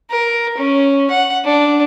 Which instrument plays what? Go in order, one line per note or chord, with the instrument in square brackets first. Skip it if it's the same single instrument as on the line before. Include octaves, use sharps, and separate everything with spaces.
[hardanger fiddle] A#4
C#4
F#5
D4